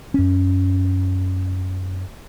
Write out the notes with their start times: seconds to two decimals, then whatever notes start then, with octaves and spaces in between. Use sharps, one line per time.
0.14 F#2 C#4